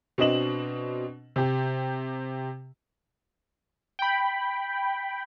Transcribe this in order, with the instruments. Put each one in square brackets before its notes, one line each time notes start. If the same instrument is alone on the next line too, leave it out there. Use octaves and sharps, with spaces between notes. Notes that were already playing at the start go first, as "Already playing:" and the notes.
[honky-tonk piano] B2 C4 D4 D#5 E7 F#7
C3 G4
[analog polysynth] G5 B5